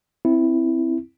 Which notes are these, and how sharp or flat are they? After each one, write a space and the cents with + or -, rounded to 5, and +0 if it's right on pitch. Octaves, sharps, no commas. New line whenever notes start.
C4 +0 E4 +0